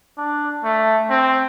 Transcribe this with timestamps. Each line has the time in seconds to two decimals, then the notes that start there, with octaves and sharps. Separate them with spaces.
0.17 D4
0.64 A3
1.10 C4